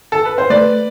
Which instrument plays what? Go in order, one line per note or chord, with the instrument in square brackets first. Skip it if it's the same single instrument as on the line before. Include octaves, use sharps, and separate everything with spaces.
[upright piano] A4
B4
C5
[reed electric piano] A3 [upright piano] B4 D5